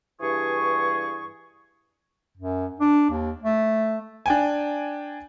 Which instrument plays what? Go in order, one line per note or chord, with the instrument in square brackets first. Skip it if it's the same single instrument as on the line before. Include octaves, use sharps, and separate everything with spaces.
[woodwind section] G2 E3 G#4 C#6
[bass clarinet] F#2
D4
D#2
A3
[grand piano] D4 G5 G#5